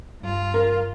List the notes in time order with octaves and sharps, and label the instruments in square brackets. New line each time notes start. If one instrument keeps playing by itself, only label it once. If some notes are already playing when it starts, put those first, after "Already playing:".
[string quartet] G2 F4
[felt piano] A#4